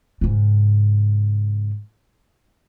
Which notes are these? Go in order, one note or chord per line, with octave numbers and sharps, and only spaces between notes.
G#2 C#3